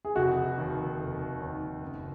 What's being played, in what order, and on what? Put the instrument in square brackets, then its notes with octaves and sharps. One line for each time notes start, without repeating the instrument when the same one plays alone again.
[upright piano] G#4
[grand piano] F1 [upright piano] F#4
[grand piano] D#2 D#3
F1
D#2 D#3
F#1